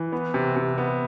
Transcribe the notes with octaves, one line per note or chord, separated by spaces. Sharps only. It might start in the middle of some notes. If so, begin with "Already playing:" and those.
Already playing: E3
B3
C3
C3
B3